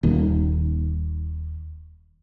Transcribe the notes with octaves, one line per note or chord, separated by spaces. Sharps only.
D#1 D#2